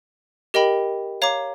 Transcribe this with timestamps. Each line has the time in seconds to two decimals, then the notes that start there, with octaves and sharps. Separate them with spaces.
0.54 G4 A#4 D#5 G5 B5
1.22 C#5 F5 A#5 D6